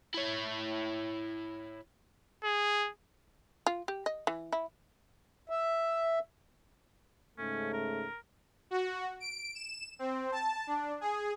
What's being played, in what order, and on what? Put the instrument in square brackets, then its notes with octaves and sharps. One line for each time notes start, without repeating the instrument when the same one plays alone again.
[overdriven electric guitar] E4 C#5
[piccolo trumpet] G#4
[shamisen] F4
G4
D#5
E3
E4
[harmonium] E5
[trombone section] G#2 C#3 A3 [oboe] C#4
[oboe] A#4
[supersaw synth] F#4
D7
E7
C4
A5
D4
G#4